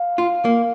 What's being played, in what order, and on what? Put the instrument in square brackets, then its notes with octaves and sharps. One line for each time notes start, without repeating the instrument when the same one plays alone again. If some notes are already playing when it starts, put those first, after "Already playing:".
Already playing: [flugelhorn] F5
[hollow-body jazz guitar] F4
A#3